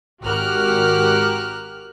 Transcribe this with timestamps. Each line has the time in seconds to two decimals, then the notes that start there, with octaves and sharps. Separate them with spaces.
0.23 G#1 F#4 G4 A#4 F6 F#6